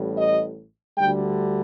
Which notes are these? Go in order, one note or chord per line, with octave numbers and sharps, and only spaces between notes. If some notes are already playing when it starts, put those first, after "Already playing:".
Already playing: A1 A2 G3
D#5
D2 D3 G3 G5